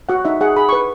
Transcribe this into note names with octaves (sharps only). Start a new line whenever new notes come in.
F#4 F#5
D#4 E5
G#4 F#5
G#4 B5
B4 C#6